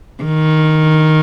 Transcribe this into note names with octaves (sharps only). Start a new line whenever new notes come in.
D#3